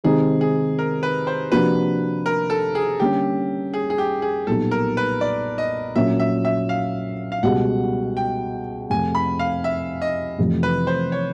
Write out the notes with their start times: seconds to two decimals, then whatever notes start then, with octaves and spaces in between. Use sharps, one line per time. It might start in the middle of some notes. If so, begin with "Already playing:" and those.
0.04 C3 D#3 G#3 C4 D#4 G#4
0.41 G#4
0.79 A#4
1.03 B4
1.27 C5
1.52 C3 F3 A#3 D4 F#4 B4
2.26 A#4
2.50 A4
2.75 G#4
3.00 D3 G3 A#3 C#4 G4
3.74 G#4
3.90 G#4
3.98 G4
4.22 G#4
4.47 B1 A#2 G3 B3 D#4 A4
4.71 A#4
4.97 B4
5.21 D5
5.58 D#5
5.95 A#1 A#2 F#3 A#3 C#4 E5
6.20 E5
6.45 E5
6.69 F5
7.32 F5
7.43 C#2 B2 G3 F#5
8.17 G5
8.90 F2 C3 F3 A3 C4 G#5
9.15 B5
9.39 F5
9.64 E5
10.02 D#5
10.38 F1 F2 C3 E3 A3
10.63 B4
10.87 C5
11.12 C#5